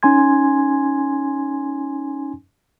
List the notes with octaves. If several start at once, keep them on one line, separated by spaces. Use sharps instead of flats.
C#4 D#4 G#5 C6 G#6